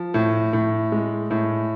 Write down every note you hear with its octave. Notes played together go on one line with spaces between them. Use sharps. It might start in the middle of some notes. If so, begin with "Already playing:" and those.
Already playing: F3
A2
A2
G#3
A2